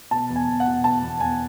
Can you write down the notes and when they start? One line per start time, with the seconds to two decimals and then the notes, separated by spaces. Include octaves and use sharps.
0.11 B2 A5
0.30 E2
0.36 G#5
0.48 E2
0.60 F#5
0.67 B2
0.84 B2 A5
1.03 E2
1.20 E2 G#5